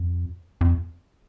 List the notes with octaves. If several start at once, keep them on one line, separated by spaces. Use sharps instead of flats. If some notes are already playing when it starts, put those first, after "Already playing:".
Already playing: F2
F2